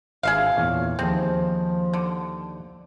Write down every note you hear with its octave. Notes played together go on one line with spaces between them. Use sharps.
G#1 D4 G#4 E5 F5
E2 A#2 C#5
D#2 F3 C4 G#4
D3